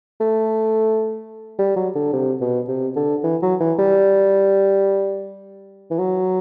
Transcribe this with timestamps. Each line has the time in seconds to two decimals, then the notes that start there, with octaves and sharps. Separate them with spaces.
0.21 A3
1.59 G3
1.76 F#3
1.95 D3
2.13 C3
2.41 B2
2.68 C3
2.96 D3
3.24 E3
3.42 F#3
3.60 E3
3.79 G3
5.91 E3
5.99 F#3